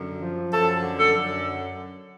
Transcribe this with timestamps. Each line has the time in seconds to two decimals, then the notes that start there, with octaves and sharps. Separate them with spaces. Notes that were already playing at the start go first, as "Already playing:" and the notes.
Already playing: F#2 D3
0.20 F3
0.51 F#2 A4
0.82 D3
0.98 A4
1.13 F#2